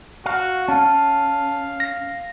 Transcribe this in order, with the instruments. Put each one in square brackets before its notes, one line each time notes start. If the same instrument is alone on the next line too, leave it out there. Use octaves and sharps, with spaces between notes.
[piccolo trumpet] F#4 [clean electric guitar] F5
[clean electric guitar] C#4 [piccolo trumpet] F5 [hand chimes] A5
[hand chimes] A#6